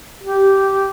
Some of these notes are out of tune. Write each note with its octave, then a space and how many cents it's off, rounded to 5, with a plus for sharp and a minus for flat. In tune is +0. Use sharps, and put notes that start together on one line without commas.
G4 -10